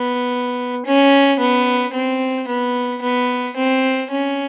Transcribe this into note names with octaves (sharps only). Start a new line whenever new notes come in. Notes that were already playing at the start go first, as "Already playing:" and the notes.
Already playing: B3
C#4
B3
C4
B3
B3
C4
C#4